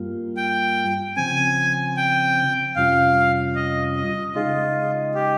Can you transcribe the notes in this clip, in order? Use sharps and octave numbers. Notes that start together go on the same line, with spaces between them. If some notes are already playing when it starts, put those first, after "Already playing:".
Already playing: G2 G3 A#3 F4
G5
C#3 F3 C4 G#5
G5
F2 C3 G3 C#4 F4 F5
D#5
D#5
C#3 G#3 D#4 F4 G#4 D#5
G4